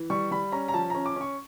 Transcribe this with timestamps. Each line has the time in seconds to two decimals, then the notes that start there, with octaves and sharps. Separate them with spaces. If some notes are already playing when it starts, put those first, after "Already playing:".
Already playing: E3
0.10 G3 C#6
0.31 G3 B5
0.52 C#4 A#5
0.68 A#5
0.74 F3 A5
0.90 C#4 A#5
1.06 D6
1.16 C#4 C#6